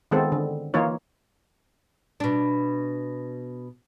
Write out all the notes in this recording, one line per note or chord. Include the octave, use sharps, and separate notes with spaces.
D#3 G#3 B3 C4 F4 A4
D3
E3 A#3 D#4 F4 C#5
B2 D4